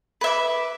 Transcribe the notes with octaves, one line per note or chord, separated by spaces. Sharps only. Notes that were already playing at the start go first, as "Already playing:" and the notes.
B4 E5 D6